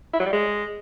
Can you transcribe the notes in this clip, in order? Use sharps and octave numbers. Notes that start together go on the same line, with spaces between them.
E4
F#3
G3
G#3